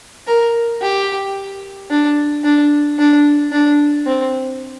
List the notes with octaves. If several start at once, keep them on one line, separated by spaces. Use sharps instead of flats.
A#4
G4
D4
D4
D4
D4
C4